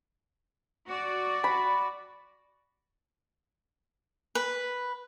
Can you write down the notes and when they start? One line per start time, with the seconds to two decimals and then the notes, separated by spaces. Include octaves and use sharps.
0.87 F#4 D5
1.44 B5
4.35 B4